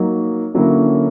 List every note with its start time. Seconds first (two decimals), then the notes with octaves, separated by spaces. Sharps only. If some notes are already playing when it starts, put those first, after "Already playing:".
Already playing: F#3 A#3 D#4
0.54 D3 F#3 A#3 C#4 E4